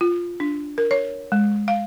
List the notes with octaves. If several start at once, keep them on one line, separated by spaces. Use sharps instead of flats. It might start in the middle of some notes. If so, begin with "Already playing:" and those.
F4
D4
A#4
C#5
G#3
F5